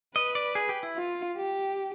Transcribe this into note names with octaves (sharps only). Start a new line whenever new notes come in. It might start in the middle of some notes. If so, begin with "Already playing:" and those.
B4 D#5
D5
G#4
G4
E4
F4
G4